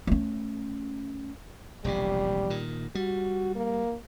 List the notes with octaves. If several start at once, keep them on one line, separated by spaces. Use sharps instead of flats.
A3 C#4
E1 A#1 C3 G3
A#2 D#3
G3 F#4
A#3